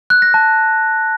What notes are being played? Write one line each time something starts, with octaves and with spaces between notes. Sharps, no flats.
F#6
A#6
A5